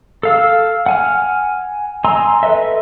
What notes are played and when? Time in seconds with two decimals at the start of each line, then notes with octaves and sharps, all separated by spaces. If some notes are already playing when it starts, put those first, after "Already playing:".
0.23 A4 F5 E6
0.86 F#5 G#5 F6
2.04 D#5 G#5 A#5 C6 E6
2.43 A4 B4 D#5 E5